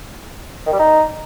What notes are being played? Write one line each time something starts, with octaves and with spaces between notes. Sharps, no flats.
D#3
G3
D#4